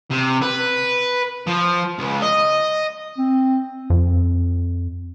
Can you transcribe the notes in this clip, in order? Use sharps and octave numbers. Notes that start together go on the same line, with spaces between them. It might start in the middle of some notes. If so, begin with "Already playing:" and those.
C3
B4
F3
C#2
D#5
C4
F2